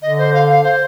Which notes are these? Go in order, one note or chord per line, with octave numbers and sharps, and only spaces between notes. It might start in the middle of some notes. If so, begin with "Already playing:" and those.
D3 D#5
C5
F5
F5
C5